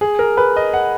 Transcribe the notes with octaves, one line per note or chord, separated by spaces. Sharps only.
G#4
A#4
B4
D#5
F#5